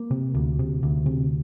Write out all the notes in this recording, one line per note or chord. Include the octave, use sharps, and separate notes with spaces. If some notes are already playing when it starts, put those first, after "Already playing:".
Already playing: A#3
C3
D2
C3
D2
C3